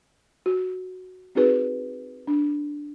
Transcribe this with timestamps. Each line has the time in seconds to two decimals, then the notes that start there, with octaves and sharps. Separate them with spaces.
0.46 F#4
1.35 C4 D#4 F#4 G#4 B4
2.27 D4